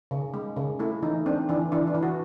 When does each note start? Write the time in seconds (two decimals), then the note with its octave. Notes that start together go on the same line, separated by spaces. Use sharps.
0.11 C#3
0.34 G#3
0.56 C#3
0.79 A3 E4
1.02 E3 D#4
1.26 C4 D4
1.49 E3 D4
1.72 E3 D4
1.87 D4
1.95 E3
2.03 F#4